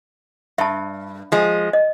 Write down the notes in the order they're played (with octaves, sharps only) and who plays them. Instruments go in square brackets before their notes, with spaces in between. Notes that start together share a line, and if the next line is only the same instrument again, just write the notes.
[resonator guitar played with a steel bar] G2 [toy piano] E5 A5
[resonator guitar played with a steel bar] F3 G#3
[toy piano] D#5